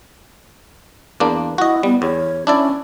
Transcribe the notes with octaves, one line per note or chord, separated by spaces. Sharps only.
E2 A#3 D4
E4 F#4 D#5
G3 B3
E2 C#5
C#4 D4 E4 D5